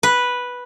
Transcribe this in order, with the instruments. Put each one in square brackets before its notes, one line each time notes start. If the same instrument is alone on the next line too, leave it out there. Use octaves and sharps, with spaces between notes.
[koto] B4